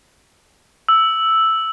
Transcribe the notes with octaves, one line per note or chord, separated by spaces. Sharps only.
E6